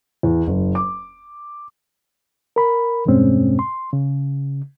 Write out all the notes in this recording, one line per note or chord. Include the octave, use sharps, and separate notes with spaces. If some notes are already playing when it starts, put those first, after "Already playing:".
E2
F#1
D6
A#4 B5
E2 G2 B2 G#3 C4 C#4
C6
C#3